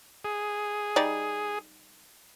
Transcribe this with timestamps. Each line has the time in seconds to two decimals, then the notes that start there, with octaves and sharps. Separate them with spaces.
0.24 G#4
0.96 G3 D#4 D5